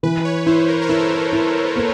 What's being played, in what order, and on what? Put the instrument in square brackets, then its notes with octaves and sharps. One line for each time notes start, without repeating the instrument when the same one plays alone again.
[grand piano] E3 [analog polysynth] B4
[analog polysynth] C#5
[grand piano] E4 [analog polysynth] C5
[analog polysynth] A#4
A#4
[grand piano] E4 [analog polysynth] A4
[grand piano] E4
A#3